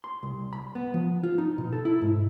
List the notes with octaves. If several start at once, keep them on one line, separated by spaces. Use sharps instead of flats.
C6
C2
B5
B3
F3
F4
D#4
B2
A4
E4
G#2